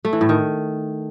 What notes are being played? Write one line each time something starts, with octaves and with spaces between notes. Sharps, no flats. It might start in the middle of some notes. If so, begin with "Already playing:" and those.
A3
E3
A2
D#3